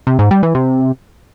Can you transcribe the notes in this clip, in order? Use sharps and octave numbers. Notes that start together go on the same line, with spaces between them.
C3
G#2
G3
E3
C3